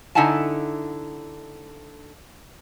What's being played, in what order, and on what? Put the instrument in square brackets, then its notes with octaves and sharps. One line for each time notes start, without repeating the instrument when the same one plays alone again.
[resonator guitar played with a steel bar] D3 D#4 E4 F#5 G#5 A5